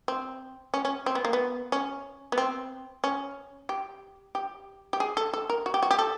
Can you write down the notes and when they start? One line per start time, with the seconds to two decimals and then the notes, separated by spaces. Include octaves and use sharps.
0.08 C4
0.74 C#4
0.85 C#4
1.06 C4
1.15 B3
1.25 A#3
1.33 B3
1.72 C#4
2.32 B3
2.38 C4
3.04 C#4
3.69 G4
4.35 G4
4.93 G4
5.00 G#4
5.17 A4
5.33 A4
5.50 A#4
5.66 F#4
5.74 G4
5.83 F#4
5.91 G4
5.99 A4